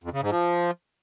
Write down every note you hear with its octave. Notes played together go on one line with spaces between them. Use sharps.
F2
C#3
G#2
F3